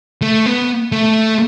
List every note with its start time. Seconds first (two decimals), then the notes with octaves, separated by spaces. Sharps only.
0.22 A3
0.46 B3
0.92 A3